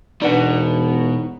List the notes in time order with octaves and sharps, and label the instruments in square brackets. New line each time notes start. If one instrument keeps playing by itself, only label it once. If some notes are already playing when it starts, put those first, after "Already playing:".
[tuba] E1 [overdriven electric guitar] B2 [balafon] D4 B4 D5 [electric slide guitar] D#4 F#5